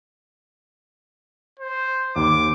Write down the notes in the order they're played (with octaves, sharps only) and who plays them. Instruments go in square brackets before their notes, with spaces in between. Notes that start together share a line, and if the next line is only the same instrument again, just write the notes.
[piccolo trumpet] C5
[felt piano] D#2 [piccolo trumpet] D6